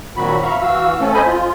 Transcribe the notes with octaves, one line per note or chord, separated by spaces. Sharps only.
A#2 D#3 F#3 C4 F#4 B5
E5 F5 A#5 B5 C#6
E3 F#4 F5 E6
A3 C4 C#4 A4
C5 D#5 G#5 B5
F4